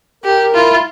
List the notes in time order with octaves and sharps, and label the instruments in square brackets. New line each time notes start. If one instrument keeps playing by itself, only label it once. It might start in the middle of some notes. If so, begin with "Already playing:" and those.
[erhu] G4 [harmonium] A#4
[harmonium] E4 [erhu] F4